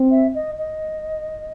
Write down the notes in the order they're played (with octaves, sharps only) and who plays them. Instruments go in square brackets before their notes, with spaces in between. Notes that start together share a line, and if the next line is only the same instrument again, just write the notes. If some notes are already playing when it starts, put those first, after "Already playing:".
Already playing: [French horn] C4
[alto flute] E5
D#5
D#5